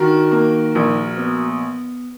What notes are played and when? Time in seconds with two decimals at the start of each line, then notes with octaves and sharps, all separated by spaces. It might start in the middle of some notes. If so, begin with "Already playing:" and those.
Already playing: D#3 D4 F#4 A#4
0.32 A#3
0.75 A#1
1.17 B3